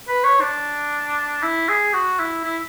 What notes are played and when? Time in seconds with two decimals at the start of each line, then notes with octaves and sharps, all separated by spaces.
0.09 B4
0.24 C#5
0.41 D4
1.43 E4
1.69 G#4
1.94 F#4
2.20 E4
2.44 E4